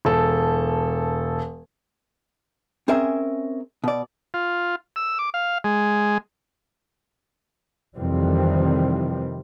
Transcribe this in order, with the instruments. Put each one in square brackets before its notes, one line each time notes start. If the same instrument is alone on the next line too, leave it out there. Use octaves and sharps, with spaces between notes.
[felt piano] E1 A4
[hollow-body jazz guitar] C4 C#4 G#4 A#4 E5
B2 D5
[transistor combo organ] F4
E6
D6
F5
G#3
[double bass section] F2 C3 D#3 E3 G3 C4